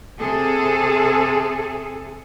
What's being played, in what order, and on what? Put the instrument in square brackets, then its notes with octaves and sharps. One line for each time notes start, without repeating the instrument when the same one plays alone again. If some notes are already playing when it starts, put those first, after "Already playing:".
[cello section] C3 G#4 A4